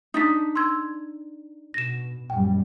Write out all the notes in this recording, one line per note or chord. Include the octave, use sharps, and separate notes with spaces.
D4 D#4 D#6 B6
C6 E6 G#6
B2 A#6 E7
A#1 F#2 G3 G5